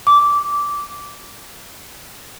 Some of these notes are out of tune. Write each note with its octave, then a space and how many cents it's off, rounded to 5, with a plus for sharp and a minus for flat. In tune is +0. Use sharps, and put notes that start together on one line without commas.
D6 -15